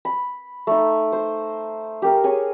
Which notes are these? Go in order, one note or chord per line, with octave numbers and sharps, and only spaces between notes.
B5
A3 D#4
C5
G4 A#4 F5
G#4 C#5 G#5